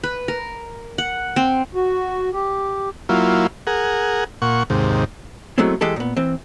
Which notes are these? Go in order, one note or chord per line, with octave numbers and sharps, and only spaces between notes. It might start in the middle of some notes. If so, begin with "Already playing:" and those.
B4
A#4
F#5
C4
F#4
G4
F#3 A#3 E4 F4
G#4 A#4 F#5
A#2 F#5 C#6
D#2 G#2 C3
F#3 G#3 A3 B3 C4 E4
E3 G#3 G4 A4
A#2 B3
E3 C4